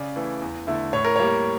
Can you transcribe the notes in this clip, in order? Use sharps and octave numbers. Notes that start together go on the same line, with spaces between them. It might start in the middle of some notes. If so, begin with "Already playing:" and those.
Already playing: C#3 D5
E3 A3 E4
E2
D3 A3 E4
A2 C#5
A#4
G3 A#3 C#5